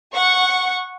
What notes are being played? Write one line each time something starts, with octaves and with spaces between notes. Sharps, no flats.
F#5 C#6